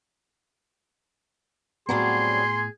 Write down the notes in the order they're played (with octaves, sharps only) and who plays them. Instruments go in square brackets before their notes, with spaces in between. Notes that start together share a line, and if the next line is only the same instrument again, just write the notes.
[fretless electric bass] A2 B3 [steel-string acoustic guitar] F#3 G3 C4 [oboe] G#4 [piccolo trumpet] C6